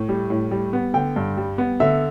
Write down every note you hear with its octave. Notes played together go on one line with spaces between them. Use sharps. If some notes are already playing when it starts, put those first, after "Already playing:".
Already playing: A2
G3
A2
G3
B3
D3 G5
G2
G3
B3
D3 E5